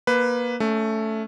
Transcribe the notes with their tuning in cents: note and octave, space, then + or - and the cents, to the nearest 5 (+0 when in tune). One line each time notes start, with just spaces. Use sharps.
A#3 +25 B4 +10
A3 +0 C#4 +25